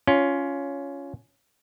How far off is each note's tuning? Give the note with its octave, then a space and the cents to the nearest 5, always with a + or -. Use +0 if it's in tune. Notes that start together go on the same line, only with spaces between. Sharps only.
C#4 +15 F4 +0